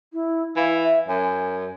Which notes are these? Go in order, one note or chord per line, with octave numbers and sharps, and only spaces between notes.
E4
E3 F5
E5
F#2 G#5